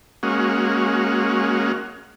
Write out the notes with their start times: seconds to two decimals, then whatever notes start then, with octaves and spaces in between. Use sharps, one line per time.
0.23 G#3 A#3 C#4 F#4